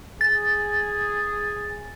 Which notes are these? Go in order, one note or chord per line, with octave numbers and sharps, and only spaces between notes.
G#4 A6